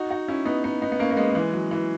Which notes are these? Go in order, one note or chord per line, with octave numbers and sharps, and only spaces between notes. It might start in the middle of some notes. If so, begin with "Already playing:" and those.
Already playing: D#4 F#4
D#4 F#4
C#4 E4
B3 D#4
B3 D#4
B3 D#4
B3
A#3 C#4
A#3
G#3 B3
A#3
E3 G#3
F#3
E3